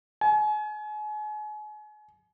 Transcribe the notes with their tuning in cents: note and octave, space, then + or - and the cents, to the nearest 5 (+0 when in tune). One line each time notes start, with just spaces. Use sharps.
G#5 +35